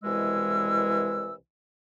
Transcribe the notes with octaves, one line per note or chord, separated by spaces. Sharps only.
C2 B2 E3 G#3 E6